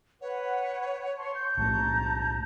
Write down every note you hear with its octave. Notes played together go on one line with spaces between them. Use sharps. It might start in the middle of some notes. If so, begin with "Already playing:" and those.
B4 C#5 F#5
A5 C6 C#6
G6
B1 A2 A3 A5 A#5